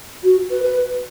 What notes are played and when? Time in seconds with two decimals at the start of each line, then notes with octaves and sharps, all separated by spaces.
0.23 F#4
0.50 B4
0.63 B4